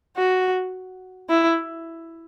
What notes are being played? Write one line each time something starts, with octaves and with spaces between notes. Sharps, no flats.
F#4
E4